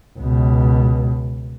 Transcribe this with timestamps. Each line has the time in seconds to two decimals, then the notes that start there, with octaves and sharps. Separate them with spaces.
0.19 C#2 B2